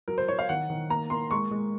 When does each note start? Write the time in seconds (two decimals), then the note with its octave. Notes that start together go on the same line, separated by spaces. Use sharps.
0.08 F#3 A#4
0.18 C5
0.28 F#3 C#5
0.39 F5
0.49 D#3 F#5
0.70 D#3
0.90 A#3 A#5
1.10 A#3 C6
1.31 G#3 C#6
1.51 G#3